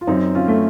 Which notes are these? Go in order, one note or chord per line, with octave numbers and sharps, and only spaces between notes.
F4
F#2 C4 D#4
C#4 F4
A3